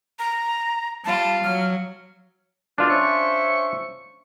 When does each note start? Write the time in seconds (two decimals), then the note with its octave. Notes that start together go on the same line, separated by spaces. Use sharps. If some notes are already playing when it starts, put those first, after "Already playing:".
0.19 A#5
1.05 G3 F4 A5
1.44 F#3 F6
2.78 B2 D#3 G3 D4 F4
2.89 C#4 C5 E5 C#6